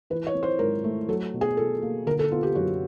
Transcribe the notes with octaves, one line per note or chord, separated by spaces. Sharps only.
E3 B4
C#5
C4
C5
G#2 A#4
A3
F#3 A4
B2
G#4
B2 A4
A#3
D3 A#4
A4
B3 F4
G4
F#2 F#4